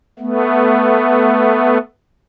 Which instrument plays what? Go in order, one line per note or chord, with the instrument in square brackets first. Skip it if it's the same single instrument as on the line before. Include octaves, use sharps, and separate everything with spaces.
[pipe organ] A3 B3